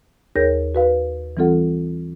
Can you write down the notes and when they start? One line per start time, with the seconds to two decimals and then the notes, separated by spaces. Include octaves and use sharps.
0.36 D#2 G#4 A#4 C#5 G6 A#6
0.75 F#4 B4 F5
1.37 E3 G3 C4 F4 A4 F#5